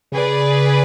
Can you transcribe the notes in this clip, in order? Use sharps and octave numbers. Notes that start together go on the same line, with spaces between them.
C#3 G#4 B4 D5